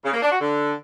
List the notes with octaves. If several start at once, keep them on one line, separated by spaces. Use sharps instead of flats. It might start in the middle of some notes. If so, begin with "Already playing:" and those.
C#3
A#3
D4
F#4
D3